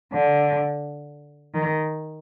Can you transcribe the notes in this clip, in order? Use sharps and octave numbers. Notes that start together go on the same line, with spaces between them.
D3
D#3